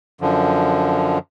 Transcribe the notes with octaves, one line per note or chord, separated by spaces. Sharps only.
F#2 D3 F3